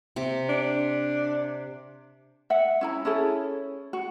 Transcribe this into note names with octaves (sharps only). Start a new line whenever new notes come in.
C3 D6
D4
E5 F#5
C#4 E4 A#5
C#4 E4 G#4 A4
F#4